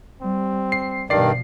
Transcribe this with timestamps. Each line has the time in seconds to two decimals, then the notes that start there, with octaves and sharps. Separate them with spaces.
0.21 G3 C4
0.72 C7
1.10 G2 B2 D#3 F3 D5 C7